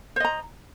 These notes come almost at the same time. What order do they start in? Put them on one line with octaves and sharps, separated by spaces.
C5 D#5 A#5